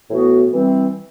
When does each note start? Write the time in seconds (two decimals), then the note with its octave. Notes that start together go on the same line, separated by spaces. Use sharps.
0.09 A2 E3 B3 F#4
0.53 E3 G3 C4